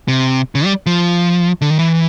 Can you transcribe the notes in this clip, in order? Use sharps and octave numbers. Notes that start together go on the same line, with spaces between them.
C3
C#3
G3
F3
D3
D#3
E3